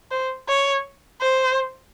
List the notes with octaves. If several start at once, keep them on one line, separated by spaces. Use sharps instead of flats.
C5
C#5
C5